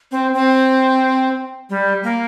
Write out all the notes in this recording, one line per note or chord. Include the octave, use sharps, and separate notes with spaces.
C4
C4
G3
A#3